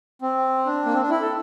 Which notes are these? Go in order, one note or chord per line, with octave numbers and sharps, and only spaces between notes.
C4
D4
A#3
C4
D4
E4
A4